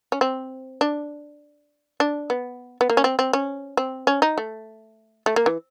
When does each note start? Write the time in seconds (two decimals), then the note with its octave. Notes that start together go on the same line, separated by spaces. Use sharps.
0.12 C#4
0.21 C4
0.81 D4
2.00 D4
2.30 B3
2.81 B3
2.90 A#3
2.97 C#4
3.04 C4
3.19 C4
3.33 C#4
3.77 C4
4.07 C#4
4.22 D#4
4.38 A3
5.26 A3
5.36 A#3
5.46 E3